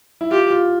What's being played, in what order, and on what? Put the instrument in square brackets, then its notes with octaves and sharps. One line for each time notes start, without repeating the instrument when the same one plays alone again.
[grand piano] E4
[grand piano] F4 [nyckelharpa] G4
[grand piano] F4